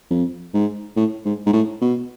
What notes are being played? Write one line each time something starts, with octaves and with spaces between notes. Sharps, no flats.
F2
G#2
A2
G#2
G#2
A2
B2